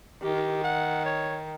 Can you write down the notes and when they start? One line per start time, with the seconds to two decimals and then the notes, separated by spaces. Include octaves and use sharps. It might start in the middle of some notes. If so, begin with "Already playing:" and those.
0.23 D#3 G4
0.64 F#5
1.05 C#5